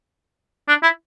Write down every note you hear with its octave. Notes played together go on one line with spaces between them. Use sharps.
D4
E4